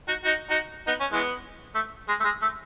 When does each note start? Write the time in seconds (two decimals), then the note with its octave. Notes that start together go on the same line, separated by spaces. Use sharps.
0.08 D#4 F#4
0.24 D#4 F#4
0.50 D#4 F#4
0.87 B3 D#4
1.00 C#4
1.12 E3 G#3 B3
1.75 A3
2.08 G#3
2.20 A3
2.24 G#3
2.42 A3